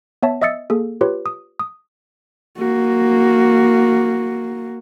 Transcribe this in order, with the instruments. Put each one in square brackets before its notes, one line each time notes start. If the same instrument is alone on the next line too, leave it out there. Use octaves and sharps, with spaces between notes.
[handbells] B3 C#5 E5 A5
D#5 E5 D#6 E6 A6 C#7
A#3 G#4 A4
F4 G4 B4 C#5
D#6
D#6
[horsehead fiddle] A#3 F#4